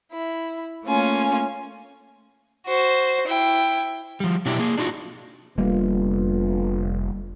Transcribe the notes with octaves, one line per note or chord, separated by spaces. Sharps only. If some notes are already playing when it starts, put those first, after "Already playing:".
E4
A3 A#3 C#4 F4 G#5
F#4 C5
E4 G5
F3 G3
B2 F#3 D4 E4 G4 D5
A#3 G#4
D4 D#4 F4 F#4
F1 D3 G3 A#3 B3 F4